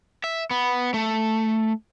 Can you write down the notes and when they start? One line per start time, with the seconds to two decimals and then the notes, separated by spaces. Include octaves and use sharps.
0.24 E5
0.51 B3
0.94 A3